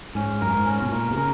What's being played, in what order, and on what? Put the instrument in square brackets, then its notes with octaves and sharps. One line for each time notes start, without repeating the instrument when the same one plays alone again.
[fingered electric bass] G#2 [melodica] C#4
[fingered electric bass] F#2 [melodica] A#4
[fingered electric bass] G#2
[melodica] C#4
[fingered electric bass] B2
[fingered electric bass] A#2 [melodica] A#4
[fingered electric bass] B2
[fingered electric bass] C#3 [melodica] A#4